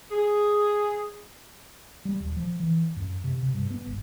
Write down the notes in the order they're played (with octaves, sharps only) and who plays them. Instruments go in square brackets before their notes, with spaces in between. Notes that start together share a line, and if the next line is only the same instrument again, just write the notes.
[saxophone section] G#4
[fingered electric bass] G3
D#1
F3
E3
F#2
C3
C3
G2
B3
G1